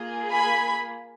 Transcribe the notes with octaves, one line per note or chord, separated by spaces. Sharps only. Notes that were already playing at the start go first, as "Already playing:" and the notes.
Already playing: A#3 F4 G#4
G#5 B5